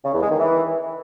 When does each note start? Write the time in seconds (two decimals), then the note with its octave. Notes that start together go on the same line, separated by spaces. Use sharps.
0.05 C#3
0.13 E2
0.22 G#3
0.31 D#3
0.39 E3